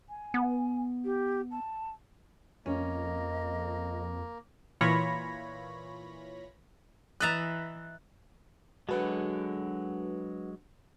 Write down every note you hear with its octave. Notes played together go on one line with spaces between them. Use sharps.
G#5
B3
G4
A5
F2 A#3 C#4 D#5
A#2 E3 F4 C#5 B5 A#6
E3 D#5 E5 A#5 F#6 A6
F#3 G#3 D4 F#4 A4 B4 F#5 A5